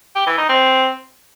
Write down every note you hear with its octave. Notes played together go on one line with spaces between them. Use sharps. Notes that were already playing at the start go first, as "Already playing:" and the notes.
G4
E3
D#4
C4